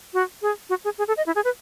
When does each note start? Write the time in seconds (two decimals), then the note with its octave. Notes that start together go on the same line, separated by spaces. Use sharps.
0.14 F#4
0.42 G#4
0.69 F#4
0.84 G#4
0.98 G#4
1.08 A4
1.17 D#5
1.26 E4
1.35 G#4
1.44 B4